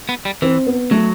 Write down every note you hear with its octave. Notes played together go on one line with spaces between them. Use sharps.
B3
G3
E3 C4
B3
F#3 A3